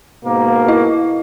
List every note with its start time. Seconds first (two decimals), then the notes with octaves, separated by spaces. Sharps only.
0.24 G#2 B2 A#3
0.68 E4 D#5